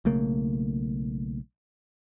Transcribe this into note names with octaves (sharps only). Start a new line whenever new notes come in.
B1 C#3 A3 A#3